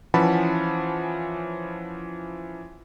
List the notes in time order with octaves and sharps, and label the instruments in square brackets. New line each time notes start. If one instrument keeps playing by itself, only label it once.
[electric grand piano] E3 F3 C#4 F#5 A5 B5